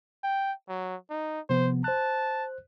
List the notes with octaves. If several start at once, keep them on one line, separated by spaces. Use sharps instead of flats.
G5
F#3
D#4
C3 F3 B3 C5
C5 A5 F#6